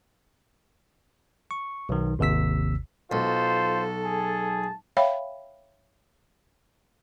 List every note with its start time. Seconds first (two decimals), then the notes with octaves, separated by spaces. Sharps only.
1.51 C#6
1.89 B1 D#3
2.19 G#1 D#2 C3 E6 B6
3.12 B1 F4 A4 C5
4.05 G#4 A5
4.97 C#5 E5 F5 G5 B5